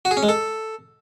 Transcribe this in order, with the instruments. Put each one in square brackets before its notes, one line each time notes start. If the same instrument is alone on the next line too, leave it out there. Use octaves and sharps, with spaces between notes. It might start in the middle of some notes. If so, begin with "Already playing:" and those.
[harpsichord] F#4
G#4
C#4
G#3
A4